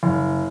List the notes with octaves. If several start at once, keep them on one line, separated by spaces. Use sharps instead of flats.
F#1